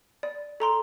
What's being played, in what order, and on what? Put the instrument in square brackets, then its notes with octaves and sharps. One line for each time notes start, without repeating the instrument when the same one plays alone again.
[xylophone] D5
A4 A#5 C6